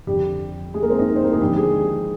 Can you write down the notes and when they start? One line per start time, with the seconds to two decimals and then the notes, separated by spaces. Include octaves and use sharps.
0.07 F2 D3 F3 G3 G4
0.74 G#3 G#4
0.82 A#3 A#4
0.90 C4 C5
0.99 D#4 D#5
1.16 C4 C5
1.24 A#3 A#4
1.33 G#3 G#4
1.40 D#2 D3 F3 G3 G4
1.57 G#3 G#4